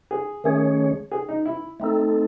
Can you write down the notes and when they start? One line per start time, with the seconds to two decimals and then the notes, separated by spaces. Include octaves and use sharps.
0.11 G#4
0.44 D#3 A3 C#4 G#4 C#5
1.11 G#4
1.29 D#4
1.46 E4
1.80 A3 C4 D#4 A4